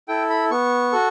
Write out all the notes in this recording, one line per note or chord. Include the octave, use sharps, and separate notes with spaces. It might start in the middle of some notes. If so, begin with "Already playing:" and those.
E4 A4 G5
B5
B3 C#6
F#4 A4